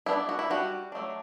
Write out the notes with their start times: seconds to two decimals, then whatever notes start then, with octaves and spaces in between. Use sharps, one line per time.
0.06 E3 B3 D4 E4
0.29 F#4
0.39 E4
0.50 G3 D4 F#4
0.92 F#3 A3 D4